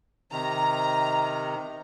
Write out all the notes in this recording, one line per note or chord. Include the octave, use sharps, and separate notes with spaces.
C3 D#3 A#5